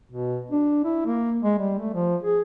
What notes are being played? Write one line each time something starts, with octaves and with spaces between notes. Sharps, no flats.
B2
D4
E4
A#3
G#3
G3
A3
F3
G#4